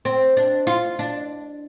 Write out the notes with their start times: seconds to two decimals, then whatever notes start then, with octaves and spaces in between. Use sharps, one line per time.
0.05 C4
0.37 D4
0.67 F4
0.99 D4